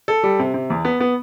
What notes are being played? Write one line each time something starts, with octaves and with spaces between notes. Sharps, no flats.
A4
G3
C3
C3
E2
B3
B3